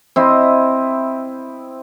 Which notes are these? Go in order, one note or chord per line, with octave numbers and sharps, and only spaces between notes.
C4 E4 D#5